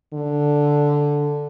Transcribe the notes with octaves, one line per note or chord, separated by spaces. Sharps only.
D3